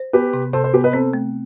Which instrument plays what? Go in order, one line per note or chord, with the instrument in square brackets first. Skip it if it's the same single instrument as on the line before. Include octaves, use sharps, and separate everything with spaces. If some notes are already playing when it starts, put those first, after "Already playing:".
Already playing: [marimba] C5
[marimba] B3 [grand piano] G4 B4
[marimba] C3
[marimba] C3 [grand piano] A4 C5
[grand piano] A4 C5
[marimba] B3 [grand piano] G4 B4
[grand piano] B4 D#5
[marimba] C4 [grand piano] A4 C5
[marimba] A3